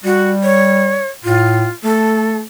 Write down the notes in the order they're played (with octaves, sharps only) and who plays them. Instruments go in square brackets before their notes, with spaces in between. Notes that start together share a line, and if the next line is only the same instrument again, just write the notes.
[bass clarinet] G3 [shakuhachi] F#4
[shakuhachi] C#5
[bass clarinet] A2 [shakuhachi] F4
[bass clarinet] A3 [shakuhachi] A4